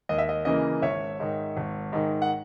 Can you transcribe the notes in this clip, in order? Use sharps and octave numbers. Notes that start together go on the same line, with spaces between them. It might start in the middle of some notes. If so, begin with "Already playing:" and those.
D#2 D#5
E5
D#5
C#3 E3 A#3 D#5
G#1 C#5 E5
G#2 D#3
G#1
G#2 D#3
F#5